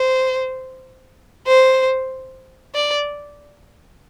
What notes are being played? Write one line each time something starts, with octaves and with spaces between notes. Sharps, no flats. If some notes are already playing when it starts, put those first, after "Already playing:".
Already playing: C5
C5
D5